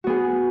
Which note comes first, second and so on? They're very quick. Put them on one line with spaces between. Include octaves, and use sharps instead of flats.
F#4 B3 G#4